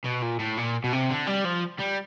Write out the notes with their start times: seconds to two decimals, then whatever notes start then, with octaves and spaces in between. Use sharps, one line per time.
0.05 B2
0.23 A#2
0.40 A2
0.57 A#2
0.84 B2
0.93 C3
1.10 D3
1.27 G3
1.45 F3
1.80 G3